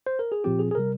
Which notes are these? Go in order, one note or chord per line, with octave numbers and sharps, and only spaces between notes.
C5
A#4
G#4
A#2 F3 C4 F4 G4
G#4
G#4
C3 G3 A#4